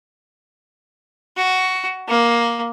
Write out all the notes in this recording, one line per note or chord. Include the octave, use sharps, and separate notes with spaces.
F#4
A#3